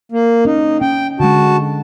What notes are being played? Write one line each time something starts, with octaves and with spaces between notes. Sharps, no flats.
A#3
C#4 D#4
C#4 G5
D3 G#3 F#4 A5